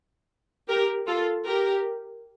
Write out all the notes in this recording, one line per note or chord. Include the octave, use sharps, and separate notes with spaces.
G4 A#4
F4 A4
G4 A#4